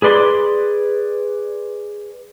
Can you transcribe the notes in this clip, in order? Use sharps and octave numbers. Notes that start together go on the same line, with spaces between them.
G#4 B4 D5 C6